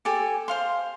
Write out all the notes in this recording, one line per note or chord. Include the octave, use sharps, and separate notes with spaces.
G4 A4 G#5
C5 F5 C6